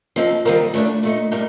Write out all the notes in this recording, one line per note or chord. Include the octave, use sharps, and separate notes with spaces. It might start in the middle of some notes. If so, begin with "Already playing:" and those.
F3 C4 D#4 A4
D#3 G3 C4 F4 A#4
A2 A3 D4
A#2 A3 D#4
A2 G3 A#3 D#4 A#4